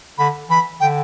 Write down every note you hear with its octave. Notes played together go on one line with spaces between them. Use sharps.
D3 B5
E3 B5
D3 G5